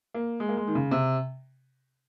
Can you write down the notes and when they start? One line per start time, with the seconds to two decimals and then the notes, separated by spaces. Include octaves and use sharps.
0.14 A#3
0.40 G#3
0.49 A#3
0.57 G#3
0.67 D#3
0.75 C#3
0.91 C3